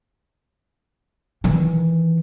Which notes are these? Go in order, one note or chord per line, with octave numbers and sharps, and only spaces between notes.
D#3 E3